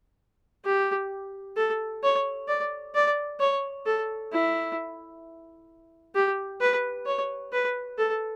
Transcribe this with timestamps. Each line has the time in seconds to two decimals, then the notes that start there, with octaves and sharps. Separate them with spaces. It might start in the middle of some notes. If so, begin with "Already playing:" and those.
0.65 G4
1.57 A4
2.03 C#5
2.48 D5
2.95 D5
3.40 C#5
3.86 A4
4.32 E4
6.15 G4
6.61 B4
7.06 C#5
7.52 B4
7.98 A4